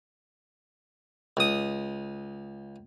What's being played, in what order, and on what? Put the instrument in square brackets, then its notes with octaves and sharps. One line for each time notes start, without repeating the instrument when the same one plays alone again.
[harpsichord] C#2 D#6